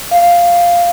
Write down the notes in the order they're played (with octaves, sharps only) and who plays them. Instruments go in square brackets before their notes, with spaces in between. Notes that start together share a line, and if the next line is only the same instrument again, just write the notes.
[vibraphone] F5